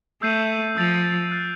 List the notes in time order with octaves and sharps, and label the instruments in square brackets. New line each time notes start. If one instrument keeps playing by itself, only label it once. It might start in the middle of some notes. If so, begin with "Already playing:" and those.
[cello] A3 [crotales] E6 G6 C7 D#7
[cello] F3 [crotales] E6 A6 D7 F7
[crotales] F#6 A6 C7